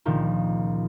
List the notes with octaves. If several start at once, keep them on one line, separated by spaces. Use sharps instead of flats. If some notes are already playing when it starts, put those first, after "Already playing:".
C#2 A#2 D#3 F3